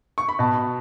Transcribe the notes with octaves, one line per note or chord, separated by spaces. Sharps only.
C#6
B5
B2 A5